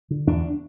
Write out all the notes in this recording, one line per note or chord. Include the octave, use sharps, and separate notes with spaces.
D3
E2 D4